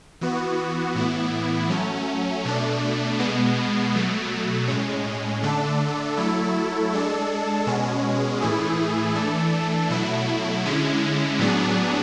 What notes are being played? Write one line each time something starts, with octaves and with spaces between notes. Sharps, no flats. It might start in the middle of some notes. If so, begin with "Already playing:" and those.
E3 B3 F#4
A2 E3 B3 E4
F#3 A3 C#4
B2 A3 D4
B2 G#3 B3
B2 F#3 A3
A2 G#3 C#4
D3 A3 D4 A4
F#3 A3 E4 A4
G#3 D4 A4
B2 G#3 C#4
A2 E3 A3 E4 G#4
E3 A3 D4 A4
B2 F#3 A3 E4
D3 G#3 C#4 E4
A2 F#3 B3 D4 G#4